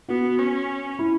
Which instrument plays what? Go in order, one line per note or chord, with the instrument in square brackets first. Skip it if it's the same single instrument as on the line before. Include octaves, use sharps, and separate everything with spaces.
[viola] B3 [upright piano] F#4
[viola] C#4
[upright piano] E4